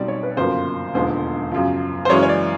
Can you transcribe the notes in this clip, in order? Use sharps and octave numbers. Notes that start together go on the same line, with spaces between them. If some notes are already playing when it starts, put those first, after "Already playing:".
Already playing: B1 B2 G3 C4 D#4 D5
C#5
B4
G1 F#2 C#3 F3 A#3 C5
E1 D#2 D3 F3 G#3 C5
F#2 C#3 F3
C5
F#2 C#3 E3 G#3 C#4 C#5
C#5
D5